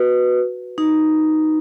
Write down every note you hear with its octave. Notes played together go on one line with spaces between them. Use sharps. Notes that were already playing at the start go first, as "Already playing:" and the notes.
Already playing: F#4 B4
D#4